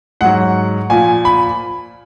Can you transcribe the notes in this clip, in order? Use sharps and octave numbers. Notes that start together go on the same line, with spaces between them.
G#2 F#3 F#5
A#2 F3 G#5
B5